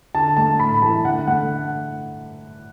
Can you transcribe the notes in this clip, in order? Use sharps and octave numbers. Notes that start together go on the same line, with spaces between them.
D3 A5
A3 A5
A2 B5
E3 A3 A5
D3 F#5
A3 F#5